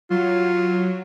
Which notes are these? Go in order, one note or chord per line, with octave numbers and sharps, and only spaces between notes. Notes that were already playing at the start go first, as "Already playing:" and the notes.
F#3 F4